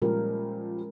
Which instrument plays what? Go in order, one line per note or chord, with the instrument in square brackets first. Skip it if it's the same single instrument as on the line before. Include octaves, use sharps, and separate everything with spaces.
[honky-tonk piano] A#2 F3 G3 [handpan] G#3 C#4 A#4